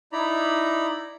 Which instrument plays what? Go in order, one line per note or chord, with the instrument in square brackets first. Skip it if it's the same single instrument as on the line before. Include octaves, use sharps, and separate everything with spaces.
[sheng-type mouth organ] D#4 E4 D5 A#5 B5